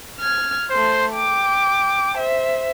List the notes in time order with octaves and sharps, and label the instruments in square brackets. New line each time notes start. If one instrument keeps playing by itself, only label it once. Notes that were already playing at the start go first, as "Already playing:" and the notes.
[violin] F6 G#6
[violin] A3 C6 [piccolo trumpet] C5
[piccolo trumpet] G5 [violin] D6
[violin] C5 E5